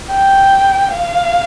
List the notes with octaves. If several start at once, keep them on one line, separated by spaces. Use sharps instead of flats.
G5
F5